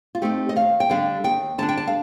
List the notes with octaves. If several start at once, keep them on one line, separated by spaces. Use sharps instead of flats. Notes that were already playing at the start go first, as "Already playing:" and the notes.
F4
A3 C4 D#4 G4
D#5
D#2 F5
G5
D3 G3 D4 F5
D#2 G5
D3 G3 D4 A5
G5
A5
F5